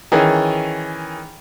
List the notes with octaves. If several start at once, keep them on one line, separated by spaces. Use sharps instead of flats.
D#3 E3 C#4 G#4